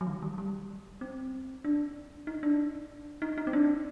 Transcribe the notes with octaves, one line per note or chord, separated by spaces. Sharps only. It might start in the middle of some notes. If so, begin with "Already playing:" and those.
F#3
D#3
G3
G3
C4
D4
D#4
D4
D#4
D#4
C4
D4